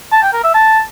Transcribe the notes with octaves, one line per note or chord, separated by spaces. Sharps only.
A5
G5
A#4
E5
A5